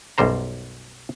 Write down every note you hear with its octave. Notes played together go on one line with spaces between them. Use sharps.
B1 F#2 G3 C5 A#5